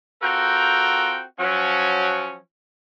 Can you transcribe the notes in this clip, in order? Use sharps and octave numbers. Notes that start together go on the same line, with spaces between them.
C4 F4 F#4 A4 A#4 G5
F3 F#3 C#4